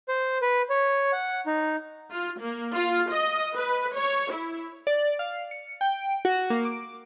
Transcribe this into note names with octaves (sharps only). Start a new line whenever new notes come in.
C5
B4
C#5
F#5
D#4
F4
A#3
F4
D#5
B4
C#5
E4
D5
F5
C#7
G5
F#4
A#3
D6